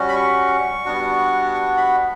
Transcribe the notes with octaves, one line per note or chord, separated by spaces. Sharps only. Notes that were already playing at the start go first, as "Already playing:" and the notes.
Already playing: G3 C#4 F#4
B5
C#6
G3 B3 D4 F#4
C#6
B5